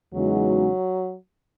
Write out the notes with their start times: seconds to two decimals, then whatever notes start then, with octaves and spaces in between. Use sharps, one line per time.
0.14 E2 C#3 F#3 G#3 D#4 F#4